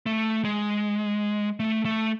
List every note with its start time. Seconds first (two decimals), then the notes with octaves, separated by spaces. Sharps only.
0.06 A3
0.45 G#3
1.60 A3
1.85 A3